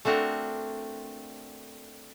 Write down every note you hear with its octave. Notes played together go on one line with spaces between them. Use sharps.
A3 C4 D4 F#4 A#4